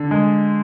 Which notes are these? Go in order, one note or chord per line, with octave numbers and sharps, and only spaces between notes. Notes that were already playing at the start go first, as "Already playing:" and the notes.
Already playing: D3
G#3